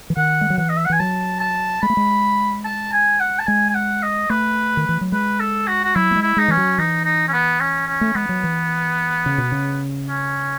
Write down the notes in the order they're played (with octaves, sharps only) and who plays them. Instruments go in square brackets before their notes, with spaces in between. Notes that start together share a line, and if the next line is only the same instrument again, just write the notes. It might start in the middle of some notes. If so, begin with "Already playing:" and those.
[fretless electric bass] E3
[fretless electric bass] D#3 [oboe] F#5
[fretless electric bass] G#3
F#3
[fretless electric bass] E3 [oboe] F#5
[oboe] D#5
E5
F#5
[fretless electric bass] E3 [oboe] G#5
[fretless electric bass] F#3 [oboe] A5
[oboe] A5
[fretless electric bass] G#3 [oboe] B5
[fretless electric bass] A3
G#3
[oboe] A5
G#5
F#5
A5
[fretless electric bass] G#3 [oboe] G#5
[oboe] G#5
F#5
D#5
[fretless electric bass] A3 [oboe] B4
[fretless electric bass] D#3
E3
F#3
[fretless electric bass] G#3 [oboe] B4
[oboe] A4
F#4
F#4
[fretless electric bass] F#3 [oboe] E4
[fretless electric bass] A3
G#3
[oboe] E4
[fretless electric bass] G#3 [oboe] D#4
[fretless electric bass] E3 [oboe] C#4
[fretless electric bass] F#3
[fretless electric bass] E3 [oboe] D#4
[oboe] D#4
C#4
B3
C#4
C#4
[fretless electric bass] A3
[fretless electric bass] G#3 [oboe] B3
[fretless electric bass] F#3
E3
C#3
B2
C#3
[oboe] C#4